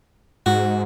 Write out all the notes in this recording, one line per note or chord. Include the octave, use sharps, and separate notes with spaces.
G#2 F#4